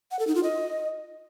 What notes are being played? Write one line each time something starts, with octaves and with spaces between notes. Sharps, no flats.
F#5
A4
D#4
F4
D#5